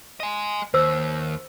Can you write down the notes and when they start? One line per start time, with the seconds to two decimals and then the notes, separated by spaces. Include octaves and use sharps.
0.20 D#5 G#5
0.74 D#2 C5 E6